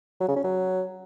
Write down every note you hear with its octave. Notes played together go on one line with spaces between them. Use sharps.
F#3
C#3
C#4
F#3